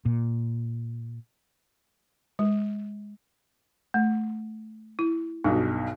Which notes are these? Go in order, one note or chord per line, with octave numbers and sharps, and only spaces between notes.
A#2
G#3
A3
E4
B1 G2 B2 D#4